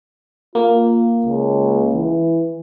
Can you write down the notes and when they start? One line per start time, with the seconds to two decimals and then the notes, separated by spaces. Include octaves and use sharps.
0.55 A#3 F4
1.26 C#2
1.94 E3